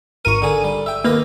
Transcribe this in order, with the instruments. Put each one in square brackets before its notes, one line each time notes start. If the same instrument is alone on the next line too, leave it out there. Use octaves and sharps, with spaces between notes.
[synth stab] G#1 D#7 [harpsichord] A#4 C#6
[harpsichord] D3 G#4
G3
E5 G5
[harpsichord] D#2 B4 D#5 [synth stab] A#3